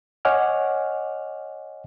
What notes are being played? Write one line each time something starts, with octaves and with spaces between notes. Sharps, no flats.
C#5 D#5 F#5 G#5 D6 F6